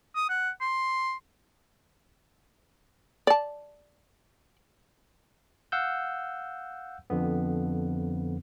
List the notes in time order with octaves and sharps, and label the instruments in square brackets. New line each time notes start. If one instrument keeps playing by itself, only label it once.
[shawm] D#6
F#5
C6
[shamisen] D5 A5
[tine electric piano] F5 F#5 E6 G6
F2 D3 B3